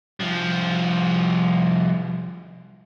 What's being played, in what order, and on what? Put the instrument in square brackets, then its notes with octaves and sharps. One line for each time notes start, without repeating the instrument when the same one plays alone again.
[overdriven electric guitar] C2 F3